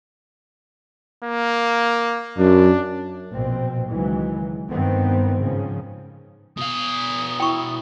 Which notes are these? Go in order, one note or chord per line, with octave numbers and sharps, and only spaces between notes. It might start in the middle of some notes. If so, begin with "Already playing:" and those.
A#3
F#2 D4
A#1 B2 C4
C#2 D#3 E3 F#3 G#3
G2 D#3 B3 C4
G#2 C#3 F3
B2 F5 D#6
E4 G5 C#6